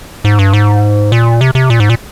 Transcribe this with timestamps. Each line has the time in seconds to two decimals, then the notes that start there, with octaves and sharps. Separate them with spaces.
0.25 G#2
0.39 G2
0.53 G#2
1.12 A#2
1.41 C3
1.55 C3
1.70 A#2
1.80 G#2
1.90 A#2